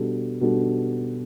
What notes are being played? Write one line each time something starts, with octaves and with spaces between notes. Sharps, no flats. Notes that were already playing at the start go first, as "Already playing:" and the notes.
Already playing: B2 G3 D4 A4
B2 G3 D4 A4